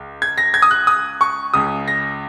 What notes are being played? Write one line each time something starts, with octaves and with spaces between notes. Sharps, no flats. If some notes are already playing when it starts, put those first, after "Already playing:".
Already playing: C#2
G#6
A#6
G#6
D#6
F#6
D#6
C#6
C#2 C#3 D#6
A#6